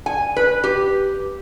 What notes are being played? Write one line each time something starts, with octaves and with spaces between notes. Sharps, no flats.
G#5
B4
G4